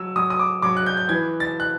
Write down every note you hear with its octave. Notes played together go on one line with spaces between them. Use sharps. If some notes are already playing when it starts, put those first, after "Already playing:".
Already playing: F#3 E6
F#3 D#6
D#6
D6
F#3 D6
F#6
G6
G6
E3 G#6
A6
F#6